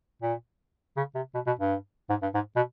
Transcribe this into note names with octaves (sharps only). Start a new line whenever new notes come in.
A#2
C#3
C3
B2
B2
G2
G#2
G2
G#2
B2